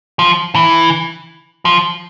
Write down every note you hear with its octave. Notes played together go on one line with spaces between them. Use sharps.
F3
E3
F3